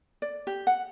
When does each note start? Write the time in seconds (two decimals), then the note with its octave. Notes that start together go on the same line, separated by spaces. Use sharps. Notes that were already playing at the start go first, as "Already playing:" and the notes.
0.22 D5
0.47 G4
0.67 F#5